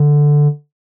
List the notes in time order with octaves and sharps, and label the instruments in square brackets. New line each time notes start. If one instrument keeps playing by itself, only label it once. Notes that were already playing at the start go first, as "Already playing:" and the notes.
Already playing: [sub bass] D3